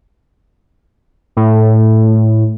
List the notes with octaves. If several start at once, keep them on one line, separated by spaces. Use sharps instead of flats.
A2